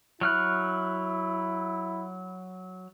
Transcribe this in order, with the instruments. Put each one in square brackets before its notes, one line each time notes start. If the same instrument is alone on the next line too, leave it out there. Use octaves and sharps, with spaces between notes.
[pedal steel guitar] F#3 F6 F#6 [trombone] E4